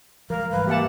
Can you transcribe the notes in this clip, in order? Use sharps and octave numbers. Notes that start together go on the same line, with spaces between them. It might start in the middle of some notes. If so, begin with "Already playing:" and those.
F3 G#3 A#4 F5
G#2 E3 G3 B4 F5
A#3 G4 E5 F#5 A5